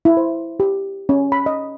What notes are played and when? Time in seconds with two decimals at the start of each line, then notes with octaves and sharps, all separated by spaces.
0.05 E4
0.17 C5
0.60 G4
1.09 C#4
1.32 B5
1.46 D#5